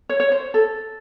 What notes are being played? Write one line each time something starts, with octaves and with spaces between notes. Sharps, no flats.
C#5
C#5
C5
A4